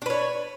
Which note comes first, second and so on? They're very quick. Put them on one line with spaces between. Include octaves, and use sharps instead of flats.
D4 B4 C#5